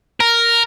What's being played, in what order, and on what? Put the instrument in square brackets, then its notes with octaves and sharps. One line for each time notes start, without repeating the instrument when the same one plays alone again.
[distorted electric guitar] A#4